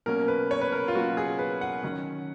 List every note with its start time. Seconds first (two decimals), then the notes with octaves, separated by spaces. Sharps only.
0.06 B2 F#3 A#3 C#4 A#4
0.28 B4
0.51 C#5
0.61 B4
0.72 A#4
0.88 F4
0.95 B2 F#3 A#3 C#4 F#4
1.17 G#4
1.39 B4
1.61 F#5
1.83 D#3 F#3 C#4